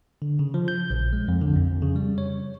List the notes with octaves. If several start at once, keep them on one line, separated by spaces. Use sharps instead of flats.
D3
C#3
F3
G6
A#1
G#3
F2
D3
F2
C#3
G3
C#5